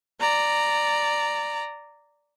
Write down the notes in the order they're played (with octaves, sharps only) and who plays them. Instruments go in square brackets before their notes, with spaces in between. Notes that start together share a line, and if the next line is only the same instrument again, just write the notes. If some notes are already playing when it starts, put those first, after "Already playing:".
[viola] D5 A#5